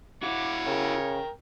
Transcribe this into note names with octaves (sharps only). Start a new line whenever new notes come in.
E4 F#4 C#5 D6
C#3 A#4 G5